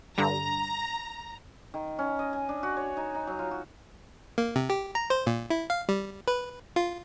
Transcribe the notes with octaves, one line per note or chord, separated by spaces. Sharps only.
G2 D3 A#5
D#3
C#4
D#5
G#5
D4
F#4
C#5
D#4
D#4
F#3
F4
F#4
A#3
C3
G4
A#5
C5
A#2
E4
F5
G3
B4
F4